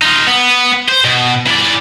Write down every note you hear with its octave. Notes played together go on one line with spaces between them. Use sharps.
D#4 F4
B3
C5
B2
E3 D5